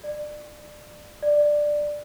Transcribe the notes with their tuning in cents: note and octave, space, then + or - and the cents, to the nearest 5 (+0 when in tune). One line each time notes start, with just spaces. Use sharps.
D5 +25
D5 +10